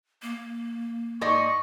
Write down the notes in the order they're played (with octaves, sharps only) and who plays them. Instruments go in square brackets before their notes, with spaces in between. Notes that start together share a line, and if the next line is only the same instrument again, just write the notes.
[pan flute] A#3
[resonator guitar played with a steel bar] G#2 D5 D#5 [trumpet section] C#6